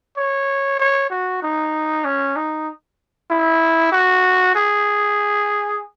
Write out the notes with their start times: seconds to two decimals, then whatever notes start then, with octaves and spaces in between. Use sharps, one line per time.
0.17 C#5
0.79 C#5
1.10 F#4
1.43 D#4
2.05 C#4
2.36 D#4
3.31 E4
3.92 F#4
4.55 G#4